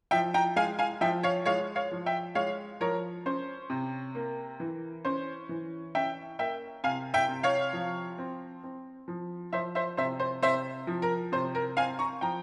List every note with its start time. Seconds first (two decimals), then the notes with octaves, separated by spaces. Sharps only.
0.11 F3 E5 G5
0.34 G5 A#5
0.56 G#3 F5 G#5
0.79 F5 G#5
1.01 F3 E5 G5
1.23 C#5 F5
1.46 G#3 C#5 F5
1.76 C#5 F5
1.92 F3
2.06 E5 G5
2.35 G#3 C#5 F5
2.80 F3 A#4 C#5
3.26 C#4 C5
3.70 C3
4.15 A#3
4.60 E3
5.05 C#4 C5
5.49 E3
5.95 C#4 E5 G5
6.39 A#3 E5 G5
6.84 C3 F5 G#5
7.14 E5 G5
7.28 C3
7.43 C#5 F5
7.73 F3
8.18 C4
8.64 C4
9.08 F3
9.53 F3 C5 E5
9.75 C5 E5
9.97 C3 C5 E5
10.20 C5
10.42 C3 C5 E5
10.87 F3
11.02 A#4
11.32 C3 C5
11.55 A#4
11.77 C4 F5 G#5
11.99 A#5 C#6
12.21 F3 G5 A#5